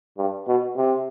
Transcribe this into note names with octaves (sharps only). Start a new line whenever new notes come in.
G2
B2
C3